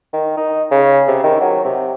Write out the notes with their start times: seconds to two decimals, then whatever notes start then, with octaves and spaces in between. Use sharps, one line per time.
0.13 D#3
0.37 D#4
0.71 C#3
1.08 C3
1.24 D#3
1.41 F#3
1.64 C3